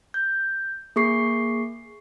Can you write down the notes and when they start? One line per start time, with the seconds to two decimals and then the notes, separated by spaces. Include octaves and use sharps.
0.14 G6
0.96 A#3 G#4 C#6 C7